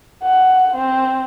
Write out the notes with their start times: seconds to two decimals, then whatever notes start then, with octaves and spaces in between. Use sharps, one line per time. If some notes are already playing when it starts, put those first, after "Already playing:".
0.23 F#5
0.75 C4